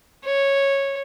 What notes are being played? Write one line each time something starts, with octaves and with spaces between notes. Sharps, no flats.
C#5